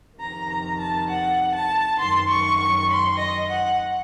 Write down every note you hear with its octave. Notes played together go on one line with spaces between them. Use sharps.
F2 C3 D#3 A#5
A#5
A5
F#5
A5
F#2 D#3 C6
C#6
C#6
C6
D#5
F#5